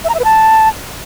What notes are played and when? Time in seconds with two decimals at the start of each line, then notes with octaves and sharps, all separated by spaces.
0.04 E5
0.09 A#5
0.14 E5
0.20 B4
0.25 A5